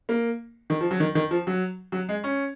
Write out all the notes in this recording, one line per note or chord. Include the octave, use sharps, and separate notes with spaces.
A#3
D#3
F3
F#3
D#3
D#3
F3
F#3
F#3
G#3
C#4